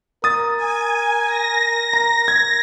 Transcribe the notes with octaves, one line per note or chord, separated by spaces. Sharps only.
A#4 D#6 A6
G#5
A#6
A#5
G#6